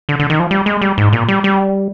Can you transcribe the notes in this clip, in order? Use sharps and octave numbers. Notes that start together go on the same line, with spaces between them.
D3
D3
D#3
F3
G3
G#3
G3
G#2
A#2
G3
G3